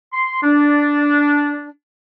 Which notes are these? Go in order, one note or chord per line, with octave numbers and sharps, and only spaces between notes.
C6
D4